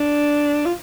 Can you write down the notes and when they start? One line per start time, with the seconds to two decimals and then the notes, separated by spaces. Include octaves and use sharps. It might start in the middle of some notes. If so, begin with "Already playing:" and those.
Already playing: D4
0.66 F4